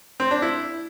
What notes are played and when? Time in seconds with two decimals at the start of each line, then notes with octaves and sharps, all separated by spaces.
0.20 C4
0.31 D4
0.42 E4